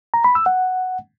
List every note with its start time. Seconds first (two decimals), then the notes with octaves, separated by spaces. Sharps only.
0.14 A#5
0.24 B5
0.35 E6
0.46 F#5